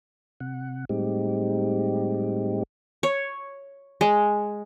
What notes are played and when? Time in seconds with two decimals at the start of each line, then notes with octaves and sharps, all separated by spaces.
0.40 C3 F#5
0.89 A2 G3 G#3 C4 D#4 G4
3.03 C#5
4.01 G#3